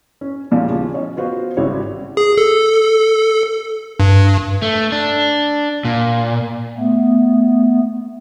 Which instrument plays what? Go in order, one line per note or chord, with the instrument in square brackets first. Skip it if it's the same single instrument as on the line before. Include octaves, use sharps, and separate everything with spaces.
[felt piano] C#4
D#2 A#2 F3 G#3
C#3 F3
C#4 C#5 D#5
B3 F4 F#4 B4 C5
G#1 C#3 G3 E4 F#4 C#5
[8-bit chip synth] G#4
A4
G2
[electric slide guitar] A3
D4
A#2
[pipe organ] A3 B3